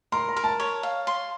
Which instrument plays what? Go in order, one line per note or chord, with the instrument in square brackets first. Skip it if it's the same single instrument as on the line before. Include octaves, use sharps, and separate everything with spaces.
[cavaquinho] A#4 [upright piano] C6
[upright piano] A#5
[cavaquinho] A#4
[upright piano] A5
[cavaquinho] C#5
F5
C6